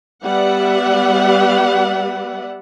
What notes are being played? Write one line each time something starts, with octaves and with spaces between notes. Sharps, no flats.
G3 B3 B4 D5 E5 F#5